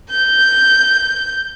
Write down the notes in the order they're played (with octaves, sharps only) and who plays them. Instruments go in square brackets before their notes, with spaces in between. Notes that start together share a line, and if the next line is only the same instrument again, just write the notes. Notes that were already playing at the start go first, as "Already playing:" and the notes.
[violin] G6